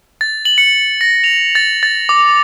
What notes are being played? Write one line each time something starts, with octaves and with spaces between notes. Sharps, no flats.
A6
F#7
C#7
A#6
F7
A6
A6
D6